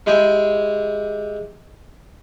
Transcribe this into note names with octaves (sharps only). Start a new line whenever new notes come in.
G#3 E4 G4 G#4 G5